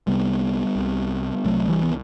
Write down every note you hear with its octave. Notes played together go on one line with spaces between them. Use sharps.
C2 C3 G3 B3
C2 C3
C2 C3 F#3 A3
E3 G3
B3